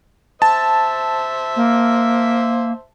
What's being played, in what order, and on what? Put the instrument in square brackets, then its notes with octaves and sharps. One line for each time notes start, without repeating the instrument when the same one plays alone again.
[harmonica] C5 E5 [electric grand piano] A5
[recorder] A#3